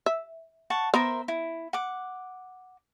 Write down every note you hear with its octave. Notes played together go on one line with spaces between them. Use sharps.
E5
F#5 A5 C#6
B3 A#4 C5 E5
E4
F#5 D6